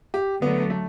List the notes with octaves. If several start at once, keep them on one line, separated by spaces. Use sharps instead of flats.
G4
D3 F#3 A3 B3
A3